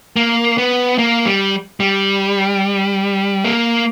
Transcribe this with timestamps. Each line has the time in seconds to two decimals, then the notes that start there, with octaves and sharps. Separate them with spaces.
0.16 A#3
0.58 B3
0.99 A#3
1.26 G3
1.80 G3
3.45 A#3